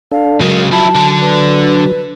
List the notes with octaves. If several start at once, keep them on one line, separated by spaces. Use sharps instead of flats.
D4 A4 F5
C#3 F#3 G#3 A#4
F3 E4 A5
D3 D4
B4